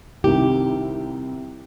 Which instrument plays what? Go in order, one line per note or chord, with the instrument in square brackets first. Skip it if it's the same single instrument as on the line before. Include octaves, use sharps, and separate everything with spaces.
[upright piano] C2 C3 D#3 [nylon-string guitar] G4